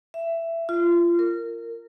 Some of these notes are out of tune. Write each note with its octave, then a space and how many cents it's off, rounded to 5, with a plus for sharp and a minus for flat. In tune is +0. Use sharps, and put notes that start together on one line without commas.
E5 +15
F4 -25
A#4 -20